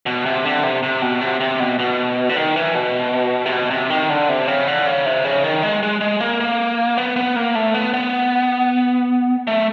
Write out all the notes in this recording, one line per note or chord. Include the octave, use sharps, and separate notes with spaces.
B2
C3
D3
C3
C3
B2
C3
C3
B2
B2
D3
D#3
E3
B2
C3
B2
C3
D#3
D3
C3
C#3
D3
C#3
C3
C#3
D#3
G#3
G#3
G#3
A#3
A#3
B3
B3
A#3
A3
B3
B3
A3